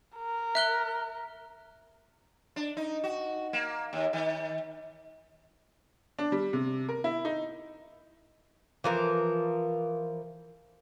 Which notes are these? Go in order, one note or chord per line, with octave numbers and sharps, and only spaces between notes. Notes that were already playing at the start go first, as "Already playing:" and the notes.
A#4
E5 F#6 G7
D4
D#4
F#4
A#3
D#2
D#3
D4
G3
C3
A#4
E4
D#4
E3 F3 A#4